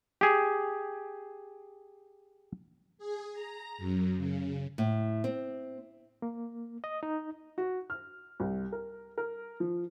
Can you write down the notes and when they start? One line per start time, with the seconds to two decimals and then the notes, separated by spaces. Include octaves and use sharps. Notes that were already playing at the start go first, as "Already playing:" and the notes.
0.21 G4 G#4
2.98 G#4
3.33 A#5
3.78 F#2
4.18 C#3
4.78 A2
5.24 C4
6.22 A#3
6.84 D#5
7.03 D#4
7.58 F#4
7.90 F6
8.40 C2
8.72 A#4
9.18 A#4
9.60 F3